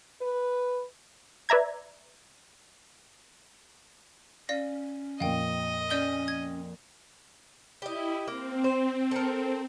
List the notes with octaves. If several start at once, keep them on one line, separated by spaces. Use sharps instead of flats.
B4
B4 D5 E5 A#5 G#6
C#4 D5 F5 A#6
F2 A#2 D#5 F5 G5
C#4 D5 G6 G7
G#6
E4 G4 D#5
A#3 C4
C5
A4 A#4